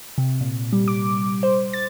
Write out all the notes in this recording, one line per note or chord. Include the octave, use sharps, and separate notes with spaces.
C3
A#2
G3
D6
C5
A6